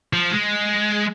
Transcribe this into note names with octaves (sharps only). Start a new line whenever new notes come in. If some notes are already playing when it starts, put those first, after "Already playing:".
F3
G#3